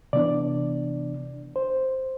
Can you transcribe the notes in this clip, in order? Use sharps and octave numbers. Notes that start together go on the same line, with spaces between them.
C3 E3 B3 D4 D5
C5